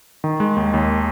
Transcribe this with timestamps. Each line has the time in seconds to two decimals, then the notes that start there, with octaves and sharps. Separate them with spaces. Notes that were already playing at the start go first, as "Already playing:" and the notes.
0.24 D#3
0.40 G#3
0.56 D#2
0.74 D#2